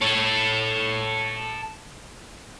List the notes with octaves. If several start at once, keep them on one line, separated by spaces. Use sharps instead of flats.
A4 C#5